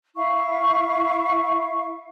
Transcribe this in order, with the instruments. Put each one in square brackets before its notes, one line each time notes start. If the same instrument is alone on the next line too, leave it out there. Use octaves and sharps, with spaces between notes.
[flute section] E4 E5 F5 C#6